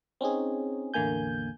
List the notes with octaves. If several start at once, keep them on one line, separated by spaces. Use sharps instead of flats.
C4 C#4 D#4 G#4
A1 E2 D3 A#3 G#5 G6